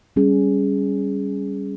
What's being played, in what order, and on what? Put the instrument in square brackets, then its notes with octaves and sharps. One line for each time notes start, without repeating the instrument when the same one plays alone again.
[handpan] G3 C#4 G#4